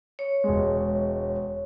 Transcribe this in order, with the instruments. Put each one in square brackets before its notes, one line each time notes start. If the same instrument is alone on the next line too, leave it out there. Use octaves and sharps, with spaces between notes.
[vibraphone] C#5
[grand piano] E1 G#3